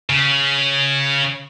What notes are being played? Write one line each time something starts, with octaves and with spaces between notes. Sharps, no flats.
C#3